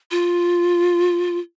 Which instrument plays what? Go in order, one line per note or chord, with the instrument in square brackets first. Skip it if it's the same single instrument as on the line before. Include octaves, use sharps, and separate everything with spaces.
[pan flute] F4